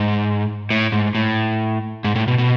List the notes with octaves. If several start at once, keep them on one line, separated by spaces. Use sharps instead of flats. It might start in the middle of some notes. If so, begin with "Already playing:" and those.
Already playing: G#2
A2
G#2
A2
G#2
A2
B2
B2